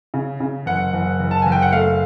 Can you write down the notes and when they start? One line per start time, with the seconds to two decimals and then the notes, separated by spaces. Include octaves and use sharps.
0.14 C#3
0.40 C#3
0.66 F#1 F#5
0.93 F#1
1.20 F#1
1.31 A5
1.42 F#1 G#5
1.52 G5
1.62 F#5
1.72 A3 F5